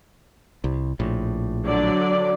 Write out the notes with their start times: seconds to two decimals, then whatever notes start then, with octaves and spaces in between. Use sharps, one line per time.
0.64 C2
1.00 A#1 A2
1.64 D3 F#3 D5